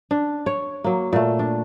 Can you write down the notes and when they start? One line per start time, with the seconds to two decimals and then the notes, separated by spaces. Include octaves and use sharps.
0.11 D4
0.46 C#5
0.84 F#3 A#3
1.13 A#2 A3
1.39 D4